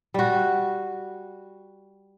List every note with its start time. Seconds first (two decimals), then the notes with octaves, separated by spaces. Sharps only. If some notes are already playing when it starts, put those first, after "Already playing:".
0.14 G3 F#4